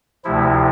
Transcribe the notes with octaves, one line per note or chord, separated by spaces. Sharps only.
D2 C3 F3 E4